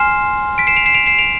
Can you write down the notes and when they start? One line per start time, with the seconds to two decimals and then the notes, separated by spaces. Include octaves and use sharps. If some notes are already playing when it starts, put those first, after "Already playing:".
Already playing: G#5 C6 F6 C7 E7
0.58 B6 D7
0.67 C7 E7
0.77 D7 F7
0.86 C7 E7
0.95 D7 F7
1.06 C7 E7
1.19 D7 F7